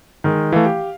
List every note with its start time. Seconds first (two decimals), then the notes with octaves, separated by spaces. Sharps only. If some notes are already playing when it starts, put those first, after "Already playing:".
0.24 D#3 G#3
0.52 E3 A3 F5
0.66 G4